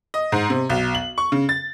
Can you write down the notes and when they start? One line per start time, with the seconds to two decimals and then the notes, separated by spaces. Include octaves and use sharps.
0.14 D#5
0.32 G#2
0.50 C3
0.70 B1
0.95 F#7
1.18 C#6
1.32 C#3
1.49 A6